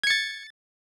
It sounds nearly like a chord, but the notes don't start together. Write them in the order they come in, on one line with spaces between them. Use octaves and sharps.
G#6 C#7 A6